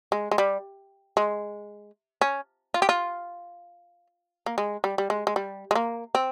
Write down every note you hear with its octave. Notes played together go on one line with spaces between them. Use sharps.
G#3
G#3
G3
G#3
C#4
F4
G4
F4
A#3
G#3
G3
G3
G#3
G#3
G3
G#3
A#3
C4